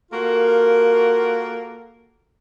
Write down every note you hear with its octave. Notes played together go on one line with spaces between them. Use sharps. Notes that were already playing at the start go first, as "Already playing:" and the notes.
A#3 F4 F#4 A4 A#4